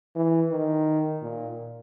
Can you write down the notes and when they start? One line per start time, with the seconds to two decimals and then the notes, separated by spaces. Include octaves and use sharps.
0.16 E3
0.51 D#3
1.23 A#2